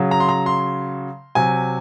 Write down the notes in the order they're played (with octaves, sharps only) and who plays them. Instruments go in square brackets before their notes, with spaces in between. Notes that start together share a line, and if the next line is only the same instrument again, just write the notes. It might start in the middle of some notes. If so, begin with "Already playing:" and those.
Already playing: [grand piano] C#3 F#3
A#5
C6
A#5
C6
C3 F#3 G#5